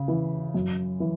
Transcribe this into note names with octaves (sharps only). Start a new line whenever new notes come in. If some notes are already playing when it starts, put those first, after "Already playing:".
Already playing: C#3
E3
F#2
E3